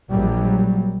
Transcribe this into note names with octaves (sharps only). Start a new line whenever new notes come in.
A#1 F#3 G3